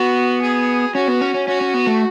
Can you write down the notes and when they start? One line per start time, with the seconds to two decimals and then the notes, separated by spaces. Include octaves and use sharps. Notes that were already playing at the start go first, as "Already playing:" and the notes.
Already playing: B3 F#4
0.42 G#4
0.95 C#4 F#4
1.08 B3
1.21 C#4
1.34 C#4
1.48 C#4 F#4
1.61 C#4
1.74 B3
1.87 A3